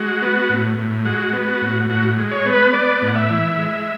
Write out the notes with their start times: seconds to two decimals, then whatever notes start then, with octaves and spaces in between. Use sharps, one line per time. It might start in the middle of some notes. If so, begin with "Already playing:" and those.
Already playing: G#3 F#4
0.22 B3
0.50 A2
0.78 A2
1.05 G#3 F#4
1.33 B3
1.48 F#4
1.61 A2
1.90 A2 F#4
2.18 G#3
2.31 C#5
2.46 B3
2.53 B4
2.73 B3 D5
3.02 A2
3.08 F#5
3.15 E5
3.30 E3
3.58 G#3